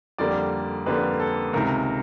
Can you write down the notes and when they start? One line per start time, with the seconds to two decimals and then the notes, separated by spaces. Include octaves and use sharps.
0.18 F2 D3 G3 A#3 D5
0.86 F2 D3 G3 A#3 B4
1.20 A4
1.53 C#2 C3 D#3 A#4